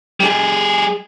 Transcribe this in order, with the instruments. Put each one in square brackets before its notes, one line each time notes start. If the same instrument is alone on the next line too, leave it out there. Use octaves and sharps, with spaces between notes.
[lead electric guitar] G3 G#4